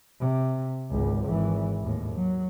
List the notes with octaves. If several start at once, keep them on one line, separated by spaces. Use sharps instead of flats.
C3
G#1 C#2
G#1 E3
D#2 A2
F#3